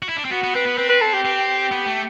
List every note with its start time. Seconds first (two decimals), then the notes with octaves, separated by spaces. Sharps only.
0.02 F#4
0.09 E4
0.17 D4
0.25 C4
0.31 B3 F#4
0.43 B3
0.55 C4 B4
0.66 B3
0.78 C4 B4
0.89 B4
1.02 A4
1.13 G4
1.25 C4
1.71 B3
1.86 A3